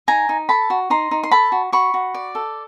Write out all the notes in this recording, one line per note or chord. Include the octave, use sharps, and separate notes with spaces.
D#4 G#5 A#5
D#4
A4 A5 B5
F#4
D#4 A#5 C6
D#4
C6
A4 A5 B5
F#4
F#4 B5 C#6
F#4
D5
A4